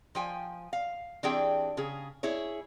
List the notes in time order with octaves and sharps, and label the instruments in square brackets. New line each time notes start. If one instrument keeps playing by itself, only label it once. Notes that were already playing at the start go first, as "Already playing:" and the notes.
[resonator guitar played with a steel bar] F3 G5 G#5
F5
E3 C4 D4 G4 G#4 G5
C#3 G#4
E4 G#4 C#5